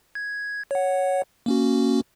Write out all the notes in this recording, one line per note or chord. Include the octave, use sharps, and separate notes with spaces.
G#6
C#5 F#5
A#3 C#4 F#4